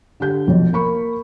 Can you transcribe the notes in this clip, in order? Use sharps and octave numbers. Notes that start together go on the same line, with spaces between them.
D3 G4 G6
F1 B1 F2
A#3 B5 C#6